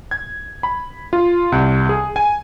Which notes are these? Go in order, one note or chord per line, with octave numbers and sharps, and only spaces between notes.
G#6
B5
F4
C2
G#4
G#5